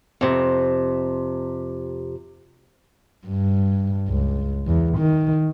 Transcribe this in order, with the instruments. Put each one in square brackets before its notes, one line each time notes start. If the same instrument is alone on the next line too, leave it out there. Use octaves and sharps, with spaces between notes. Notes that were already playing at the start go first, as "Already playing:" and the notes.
[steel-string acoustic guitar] F2 C3
[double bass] G2
C#2
E2
D#3